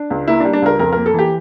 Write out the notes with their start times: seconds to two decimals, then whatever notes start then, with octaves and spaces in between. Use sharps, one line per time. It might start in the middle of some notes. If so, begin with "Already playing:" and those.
Already playing: D4
0.10 C#2
0.28 A#3 E4
0.40 D4
0.45 G3
0.53 D4
0.62 C#2 A#4
0.79 F2 A#4
0.93 A#3 A#4
1.06 A4
1.14 E3 G4